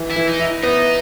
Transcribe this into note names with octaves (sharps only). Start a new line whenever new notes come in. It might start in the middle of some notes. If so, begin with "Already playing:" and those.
Already playing: E3
E4
E3
D#4
E4
B3 D#4